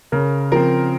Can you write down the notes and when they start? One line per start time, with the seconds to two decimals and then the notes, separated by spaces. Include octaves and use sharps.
0.12 C#3 A#4
0.52 F3 C4 A#4